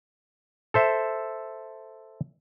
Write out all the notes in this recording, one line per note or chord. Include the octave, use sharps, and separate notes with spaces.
A4 C5 E5